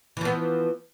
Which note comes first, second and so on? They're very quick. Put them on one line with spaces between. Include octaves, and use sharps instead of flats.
E3 F3 B3